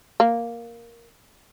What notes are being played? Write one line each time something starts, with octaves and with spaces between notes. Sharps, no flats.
A#3